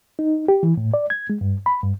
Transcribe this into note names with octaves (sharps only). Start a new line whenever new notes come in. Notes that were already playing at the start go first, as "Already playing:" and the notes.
D#4
G4
E3
A2
D5
G#6
G#3
G2
B5
G2